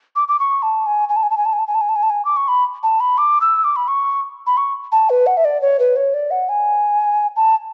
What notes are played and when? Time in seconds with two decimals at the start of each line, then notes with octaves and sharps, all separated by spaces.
0.16 D6
0.28 D6
0.39 C#6
0.62 A5
0.86 G#5
1.09 G#5
1.16 A5
1.23 G#5
1.30 A5
1.37 G#5
1.45 A5
1.53 G#5
1.59 A5
1.67 G#5
1.74 A5
1.81 G#5
1.89 A5
1.96 G#5
2.03 A5
2.10 G#5
2.25 D6
2.36 C#6
2.48 B5
2.83 A5
3.00 B5
3.18 D6
3.41 E6
3.64 D6
3.76 B5
3.88 C#6
4.47 B5
4.57 C#6
4.92 A5
5.10 B4
5.27 F#5
5.37 E5
5.45 D5
5.61 C#5
5.79 B4
5.96 C#5
6.14 D5
6.31 F#5
6.49 G#5
7.36 A5